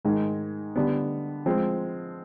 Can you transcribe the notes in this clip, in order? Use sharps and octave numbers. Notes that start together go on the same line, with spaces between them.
G#2 D#3 G#3
D3 G3 B3
F3 G#3 C4